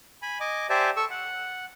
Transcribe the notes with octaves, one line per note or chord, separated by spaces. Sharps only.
G#5 B5
D#5 G#5 D6
G4 C5 D5 E5 G#5 A5
A4 C#6 E6
F#5